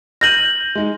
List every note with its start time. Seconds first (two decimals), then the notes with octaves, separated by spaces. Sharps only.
0.21 F6 G6 A#6 D#7 F#7
0.75 G#3 D#4